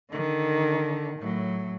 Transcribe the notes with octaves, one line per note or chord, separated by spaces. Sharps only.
D3 D#3
A2 F#3